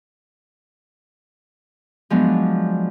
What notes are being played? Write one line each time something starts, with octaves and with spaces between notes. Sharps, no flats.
F3 F#3 G#3 B3 D4